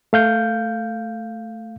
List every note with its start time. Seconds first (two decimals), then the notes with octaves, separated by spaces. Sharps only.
0.13 A3 F5 G6